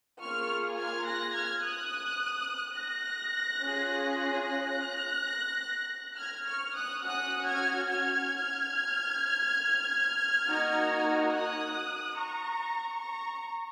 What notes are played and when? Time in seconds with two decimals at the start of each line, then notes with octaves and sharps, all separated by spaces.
0.21 A#3 F4 G#4 C#6 F6
0.78 F6 G#6
1.06 F#6 A#6
1.35 F6 G#6
1.63 D#6 F#6
2.78 F#6 A#6
3.63 C#4 F4 G#4
4.47 F#6 A#6
6.18 F6 G#6
6.47 C#6 F6
6.76 D#6 F#6
7.04 C#4 F#4 D#6 F#6
7.47 F6 G#6
7.90 F6 G#6
10.46 A#3 D#4 F#4
11.31 D#6 F#6
12.17 A#5 C#6
13.02 A#5 C#6